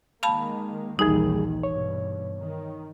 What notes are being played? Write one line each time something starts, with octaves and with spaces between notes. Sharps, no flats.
D#3 G#3 A#3 F5 A5 B5
A#1 D#2 D#3 E3 G3 D#4 G#4
G2 B2 C#5
D#3